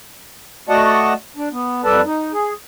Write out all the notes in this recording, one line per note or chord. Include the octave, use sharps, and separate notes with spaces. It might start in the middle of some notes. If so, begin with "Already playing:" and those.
A3 F#4 D5 D#5 F#5 A5
D4
B3
F2 G3 A4 B4 D5 A5
D#4
G#4